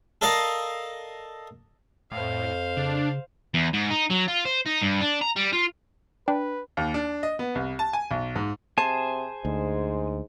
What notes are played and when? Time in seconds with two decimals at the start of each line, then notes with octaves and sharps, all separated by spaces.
0.21 A4 A#4 D5 D#5 F5
2.12 F2 A2 C5 F5
2.77 C#3 D4
3.54 E2
3.74 G#2
3.91 D#4
4.10 F#3
4.28 F4
4.45 C5
4.66 D#4
4.81 G2
5.01 D4
5.21 A#5
5.36 G3
5.53 F4
6.28 D4 B4 G5
6.77 D#2
6.94 D4
7.23 D#5
7.39 B3
7.55 C2
7.79 A5
7.93 G#5
8.11 B1
8.36 G#2
8.78 C3 G#4 C5 G#5 A5
9.45 D2 G#2